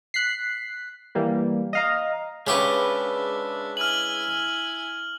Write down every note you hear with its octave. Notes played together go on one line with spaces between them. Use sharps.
F#6 B6 C7
E3 G3 A#3
D#5 F5 A#5
C#3 G#3 D4 G4 B4 E5 C#6
E4 G#5 F6 F#7